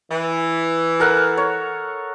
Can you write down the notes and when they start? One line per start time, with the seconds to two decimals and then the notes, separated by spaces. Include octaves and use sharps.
0.10 E3
1.00 A4 A#4 F#5
1.37 C#5